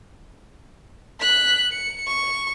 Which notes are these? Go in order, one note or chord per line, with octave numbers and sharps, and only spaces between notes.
F#6 B6
C#7
C#6